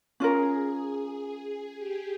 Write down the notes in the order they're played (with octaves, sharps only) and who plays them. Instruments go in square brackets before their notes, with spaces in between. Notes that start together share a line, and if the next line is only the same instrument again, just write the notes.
[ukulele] C#4 F4 A#4 [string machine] G#4
[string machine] G#4
G4